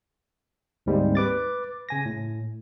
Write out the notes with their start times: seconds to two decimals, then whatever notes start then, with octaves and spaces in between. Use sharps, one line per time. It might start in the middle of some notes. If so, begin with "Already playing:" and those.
0.86 D2 G#2 G3 G#3 A#3 C4
1.15 B4 D6 A6
1.89 C#3 G#5 A#6
2.06 A2